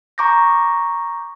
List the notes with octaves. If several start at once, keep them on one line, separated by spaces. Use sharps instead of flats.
A#5 C#6 D6 G6 A#6